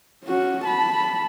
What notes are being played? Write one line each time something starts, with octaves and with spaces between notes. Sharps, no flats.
C#4 F#4
A5 B5